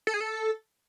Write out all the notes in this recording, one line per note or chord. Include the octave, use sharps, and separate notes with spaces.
A4
G#4
A4